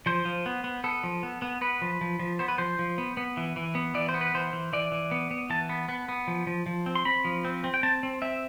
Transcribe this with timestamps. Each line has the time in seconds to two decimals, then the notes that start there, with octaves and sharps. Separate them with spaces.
0.06 F3 C5
0.25 F3
0.46 B3
0.64 B3
0.84 B3 A4
1.03 F3
1.23 B3
1.42 B3
1.61 B3 B4
1.82 F3
2.01 F3
2.19 F3
2.39 B3 C5
2.48 B4
2.58 F3 C5
2.79 F3
2.98 B3
3.17 B3
3.37 E3
3.56 E3
3.75 B3
3.94 E3 D5
4.09 C5
4.14 B3
4.21 B4
4.34 E3 C5
4.53 E3
4.73 E3 D5
4.92 E3
5.11 B3
5.31 B3
5.50 E3 A5
5.69 B3
5.89 B3
6.09 B3
6.27 F3
6.47 F3
6.66 F3
6.86 C4
6.95 C6
7.05 C4 B5
7.25 F3
7.45 C4
7.64 C4
7.74 G5
7.83 C4 A5
8.03 C4
8.22 C4 E5